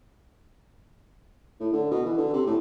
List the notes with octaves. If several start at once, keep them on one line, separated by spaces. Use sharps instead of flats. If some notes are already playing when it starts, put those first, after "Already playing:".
A2
D3
B2
E3
D3
C3
A2